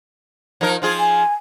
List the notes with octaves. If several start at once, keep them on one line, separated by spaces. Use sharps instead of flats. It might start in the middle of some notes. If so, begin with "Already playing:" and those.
F3 D#4 A#4
F3 F4 G#4
G#5